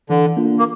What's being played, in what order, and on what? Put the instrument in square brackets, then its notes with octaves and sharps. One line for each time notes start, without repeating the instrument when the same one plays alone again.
[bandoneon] D3 [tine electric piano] E3
[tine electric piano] A#3 D4 F4
[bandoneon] A#3